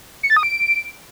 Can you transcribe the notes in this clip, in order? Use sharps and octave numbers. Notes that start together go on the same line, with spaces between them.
C#7
A6
D#6
D7